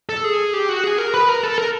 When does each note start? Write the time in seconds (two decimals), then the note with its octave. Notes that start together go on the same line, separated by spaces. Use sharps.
0.09 A4
0.24 G#4
0.53 G4
0.69 F#4
0.84 G#4
0.98 A#4
1.14 B4
1.29 A#4
1.43 A4
1.58 A#4